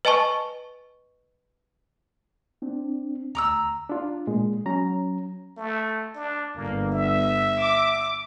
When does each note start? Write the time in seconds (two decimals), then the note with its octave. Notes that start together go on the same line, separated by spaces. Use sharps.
0.05 B4 D#5 G#5 A5 C#6
2.62 C4 D4
3.35 D2 A#5 D6 E6
3.89 D4 F4
4.27 A#2 G#3
4.66 F#3 C#4 A#5
5.57 A3
6.15 D4
6.56 G1 A#3
6.92 E5
7.60 D6